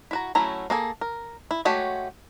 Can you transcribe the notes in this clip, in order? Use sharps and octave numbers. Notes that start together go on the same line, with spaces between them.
E4 F#4 A#5
F#3 A3 C#4 E4 A#5
A#3 G#4 A4
A#4
E4
G#3 A3 F#4 G4 C#5